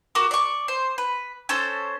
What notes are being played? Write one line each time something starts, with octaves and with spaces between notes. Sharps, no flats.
F#4 A#4 D6
D5 C#6
C5
B4
C#4 A4 C5